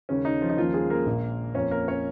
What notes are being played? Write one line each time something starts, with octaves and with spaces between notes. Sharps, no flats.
D#2 C#3 G#3 C#4
D#4
F3 F4
D#4
D#2 C#3 F3 A#3 F4
G#3 G#4
A#3 A#4
A#1 A#2 G#3
F2 F3 A#3 C#4 C#5
A#3 A#4
C#4 C#5